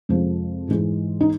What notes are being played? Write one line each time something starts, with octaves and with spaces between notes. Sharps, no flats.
F2 C3 F3 G#3
G#2 E3 G#3
D#4